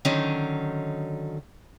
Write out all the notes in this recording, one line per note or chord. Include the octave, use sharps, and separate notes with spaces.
D3 D#3 F#3 C#4 D#4